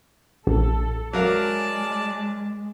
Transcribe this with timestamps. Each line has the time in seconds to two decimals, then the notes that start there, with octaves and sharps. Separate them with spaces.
0.47 A#1 A4
1.13 F#3 G#3 A#4 D5 F5 A5